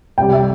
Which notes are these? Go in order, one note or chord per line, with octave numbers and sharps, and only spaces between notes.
C2 C3 G3 G5
E5